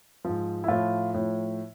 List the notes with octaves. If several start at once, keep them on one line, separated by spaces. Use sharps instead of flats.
G#2 F3
E4
A2 F3 F4
A2 F3